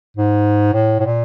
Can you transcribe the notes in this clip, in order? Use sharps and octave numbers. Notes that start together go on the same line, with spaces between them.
G#2
A2
A2
A#2